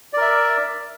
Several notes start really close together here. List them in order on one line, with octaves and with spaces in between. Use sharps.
D5 A#4 E5